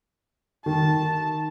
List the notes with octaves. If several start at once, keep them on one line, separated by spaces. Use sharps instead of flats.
D#3 A5